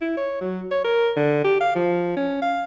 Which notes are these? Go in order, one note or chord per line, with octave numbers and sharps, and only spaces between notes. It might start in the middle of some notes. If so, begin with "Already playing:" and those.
E4
C#5
F#3
C#5
A#4
D3
G4
F5
F3
C#4
F5